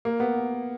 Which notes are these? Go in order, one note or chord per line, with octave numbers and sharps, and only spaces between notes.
A#3
B3